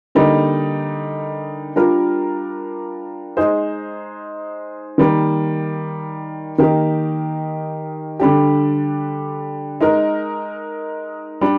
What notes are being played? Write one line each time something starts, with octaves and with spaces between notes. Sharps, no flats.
D3 G3 A#3 D#4
G3 D4 F4 A#4
G#3 D#4 G#4 C5
D#3 G3 A#3
D#3 A#3 D#4 G4
D3 G3 D4 G4
G#3 D#4 A#4
G3 D4